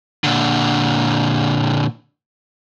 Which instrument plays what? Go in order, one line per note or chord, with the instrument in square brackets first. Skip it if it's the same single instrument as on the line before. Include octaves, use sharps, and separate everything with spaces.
[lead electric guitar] A#2 D3